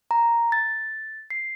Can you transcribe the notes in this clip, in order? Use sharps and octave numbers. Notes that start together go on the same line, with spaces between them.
A#5
A6
C7